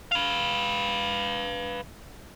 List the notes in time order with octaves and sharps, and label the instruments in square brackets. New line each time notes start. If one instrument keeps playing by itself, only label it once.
[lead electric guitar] B4 F5